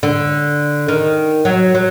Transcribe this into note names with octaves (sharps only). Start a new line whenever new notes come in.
D3
D#3
F#3
F#3